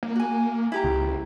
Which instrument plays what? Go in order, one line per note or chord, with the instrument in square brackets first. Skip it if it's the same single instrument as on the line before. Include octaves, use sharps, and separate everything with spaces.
[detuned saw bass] A#3
[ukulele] F#4 G#5
E4 G4 A#5
[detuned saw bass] C#2